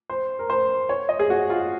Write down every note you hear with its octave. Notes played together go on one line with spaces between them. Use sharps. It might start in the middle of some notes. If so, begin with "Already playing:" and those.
C5
A#4
C5
C#5
D#5
G#4
F#4
F4